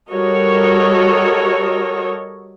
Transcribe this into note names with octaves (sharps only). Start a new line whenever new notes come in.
G3 F#4 A4 A#4 C#5 D#5